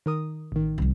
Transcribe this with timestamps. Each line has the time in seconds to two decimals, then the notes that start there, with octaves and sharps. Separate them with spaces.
0.06 D#3 A#4 D#6
0.52 A1 D#3
0.78 C2 F3